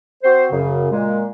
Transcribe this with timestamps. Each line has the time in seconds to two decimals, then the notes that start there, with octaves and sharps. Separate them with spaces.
0.23 C4 F#4 C5
0.52 F#2 C#3
0.91 A#2 G#3